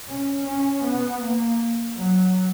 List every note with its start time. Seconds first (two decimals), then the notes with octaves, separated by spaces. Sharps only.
0.08 C#4
0.47 C#4
0.84 B3
1.21 A#3
1.97 F#3